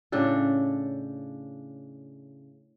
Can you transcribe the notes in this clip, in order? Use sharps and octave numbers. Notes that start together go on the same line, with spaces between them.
A2 C#3 D4 A4